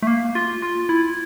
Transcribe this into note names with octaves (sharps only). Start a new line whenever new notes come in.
A3
A#3
F4
F4
E4